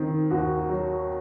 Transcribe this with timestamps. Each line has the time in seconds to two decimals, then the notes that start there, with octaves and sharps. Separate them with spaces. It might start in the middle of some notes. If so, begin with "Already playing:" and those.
Already playing: D#3 C4
0.31 D#2 F#4
0.69 F#3